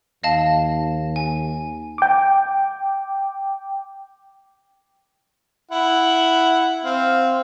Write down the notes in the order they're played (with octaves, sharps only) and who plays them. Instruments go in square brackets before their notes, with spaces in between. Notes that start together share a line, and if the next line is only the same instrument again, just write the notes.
[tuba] D#2 [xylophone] D#5 F5 A5
[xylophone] G#5
[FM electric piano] G5 D6
[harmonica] E4 F#5
C4 F5